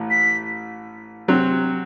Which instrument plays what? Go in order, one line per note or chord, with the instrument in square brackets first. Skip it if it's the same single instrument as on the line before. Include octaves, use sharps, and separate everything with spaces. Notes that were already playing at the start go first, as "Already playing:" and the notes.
Already playing: [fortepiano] A1 A2
[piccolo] B6
[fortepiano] C3 F#3 C4